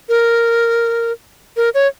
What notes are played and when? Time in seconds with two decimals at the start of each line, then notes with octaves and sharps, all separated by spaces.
0.09 A#4
1.57 A#4
1.74 C#5